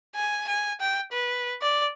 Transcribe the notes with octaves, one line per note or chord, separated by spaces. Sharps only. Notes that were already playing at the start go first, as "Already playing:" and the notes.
G#5
G#5
G5
B4
D5